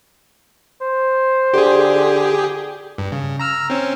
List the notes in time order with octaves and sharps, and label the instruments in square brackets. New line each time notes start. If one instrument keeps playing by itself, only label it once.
[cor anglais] C5
[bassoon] D3 [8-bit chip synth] G4 G#4
[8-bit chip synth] G2
C#3
A#5 E6 F6
C4 C#4